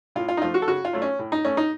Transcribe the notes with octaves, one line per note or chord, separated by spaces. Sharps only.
A2 F4
F4
D#4
F3 A3 F4
F#4
A4
C#3 F#4
F4
F#3 A3
C#4
A2
D#4
A3 C#4
D#4